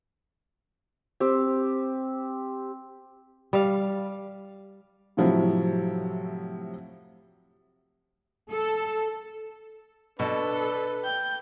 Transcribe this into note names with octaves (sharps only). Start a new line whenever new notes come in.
C4 G4
G3 F5
A2 C3 F3 F#3 E4
A4
B2 D4 A4 B4
G5 G6